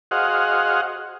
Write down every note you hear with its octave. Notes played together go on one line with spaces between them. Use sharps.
F#4 G#4 C5 D#5 F5 F#5